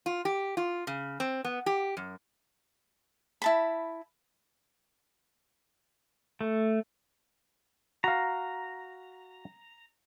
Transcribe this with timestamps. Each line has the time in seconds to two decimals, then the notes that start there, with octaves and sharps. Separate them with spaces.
0.06 F4
0.25 G4
0.57 F4
0.87 C#3
1.20 C4
1.44 B3
1.66 G4
1.97 F#2
3.42 E4 A5 B5
6.41 A3
8.04 F#4 F5 A#5